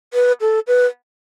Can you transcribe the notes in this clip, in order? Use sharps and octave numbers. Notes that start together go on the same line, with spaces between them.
B4
A4
B4